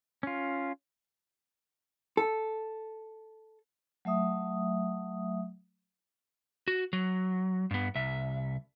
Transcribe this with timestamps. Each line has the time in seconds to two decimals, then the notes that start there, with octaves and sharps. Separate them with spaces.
0.23 C#4 F4
2.17 A4
4.05 F#3 A3 E5 D#6
6.68 F#4
6.93 F#3
7.71 G2 B3
7.95 C2 E5